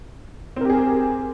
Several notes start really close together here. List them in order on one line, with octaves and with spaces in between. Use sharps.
C4 A#4 G4 G#4